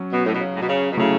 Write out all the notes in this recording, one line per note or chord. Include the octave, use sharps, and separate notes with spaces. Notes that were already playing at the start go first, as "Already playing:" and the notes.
Already playing: F#3 C#4
B2
A2
B2
C#3
A2
B2
C#3
B2
C#3 F#3 A3 E4